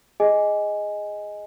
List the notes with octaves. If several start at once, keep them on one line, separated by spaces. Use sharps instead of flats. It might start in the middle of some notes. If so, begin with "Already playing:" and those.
G#4 D#5 G#5